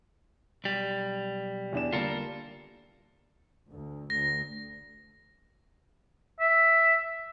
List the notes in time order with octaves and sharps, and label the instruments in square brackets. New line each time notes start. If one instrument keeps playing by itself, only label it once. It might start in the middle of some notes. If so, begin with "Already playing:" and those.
[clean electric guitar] B1 G3
[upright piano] E2 D4 E7
[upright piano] D3 G3 A#3 [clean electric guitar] F4 A4 A#4
[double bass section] D2
[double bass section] D2 [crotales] A#6
[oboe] E5